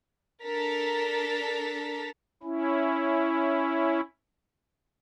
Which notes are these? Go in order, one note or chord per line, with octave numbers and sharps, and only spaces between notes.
D4 A4 A#4 A#5 A6 B6
C#4 E4